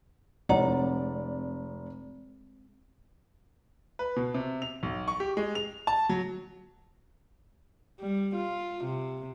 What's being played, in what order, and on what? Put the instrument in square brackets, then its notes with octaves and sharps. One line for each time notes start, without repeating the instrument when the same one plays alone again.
[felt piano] F1 D5 [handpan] G#3 C4 [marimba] C#5 F#5 A#5
[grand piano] B4
B2
C3
F7
B1
C#6
G4
G#3
F7
A5
F#3
[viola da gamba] G3
F4
C3